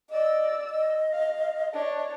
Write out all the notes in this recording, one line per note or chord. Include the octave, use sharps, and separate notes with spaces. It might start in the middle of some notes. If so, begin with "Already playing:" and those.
D5 D#5 E6
D#5
F5
D4 C#5